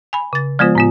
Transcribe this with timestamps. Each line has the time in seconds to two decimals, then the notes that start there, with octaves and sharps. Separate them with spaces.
0.13 G#5 B5
0.33 C#3 A6
0.59 F3 G#3 B3 F4 C5
0.75 A2 B3 F4